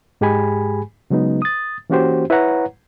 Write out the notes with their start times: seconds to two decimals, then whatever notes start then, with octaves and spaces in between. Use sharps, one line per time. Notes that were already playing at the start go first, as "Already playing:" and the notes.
0.21 G#2 G#3 G4 G#4 G#5 B5
1.10 C#3 F#3 G#3 B3 D#4
1.42 D#6 A6
1.90 E3 A#3 C#4 F#4 G4 C5
2.30 E4 B4 C#5 F#5 A#5